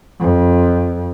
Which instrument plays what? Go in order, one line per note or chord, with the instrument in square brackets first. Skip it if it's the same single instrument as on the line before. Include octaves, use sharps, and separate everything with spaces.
[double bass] F2